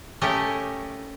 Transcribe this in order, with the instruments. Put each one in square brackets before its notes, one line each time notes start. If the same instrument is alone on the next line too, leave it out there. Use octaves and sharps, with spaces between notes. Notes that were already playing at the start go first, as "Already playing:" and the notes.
[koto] A3 C#4 G4 A#4 D#5